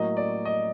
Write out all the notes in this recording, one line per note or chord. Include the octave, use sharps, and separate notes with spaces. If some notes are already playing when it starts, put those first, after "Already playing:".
Already playing: A2 F#3 A#3 D#5
D5
D#5